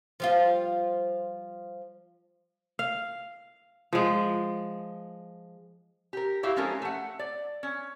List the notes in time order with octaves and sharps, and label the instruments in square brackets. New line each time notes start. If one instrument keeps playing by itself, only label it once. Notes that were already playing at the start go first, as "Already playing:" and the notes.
[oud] F3 G3 F4
[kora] F5
F3 G#3
[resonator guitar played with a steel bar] G4 A#4
E4 F#4 G4 A#4 E5 F5
F3 G#3 C#4 D#4 A4 A#4
A3 F#5
D5
C#4